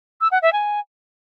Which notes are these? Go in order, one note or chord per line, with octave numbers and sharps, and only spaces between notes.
E6
F#5
E5
G#5